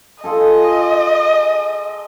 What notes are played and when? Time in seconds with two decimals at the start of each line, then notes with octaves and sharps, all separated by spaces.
0.24 F4 G#4 A4 D#5